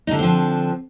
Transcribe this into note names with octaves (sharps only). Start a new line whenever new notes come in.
D3 F3 C4 D4 D#4